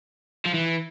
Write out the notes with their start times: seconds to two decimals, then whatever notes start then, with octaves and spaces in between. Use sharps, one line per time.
0.46 F3
0.54 E3